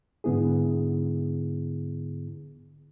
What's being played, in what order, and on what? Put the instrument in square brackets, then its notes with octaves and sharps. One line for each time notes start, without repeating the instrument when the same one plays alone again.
[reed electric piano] G#2 D3 B3 E4 G#4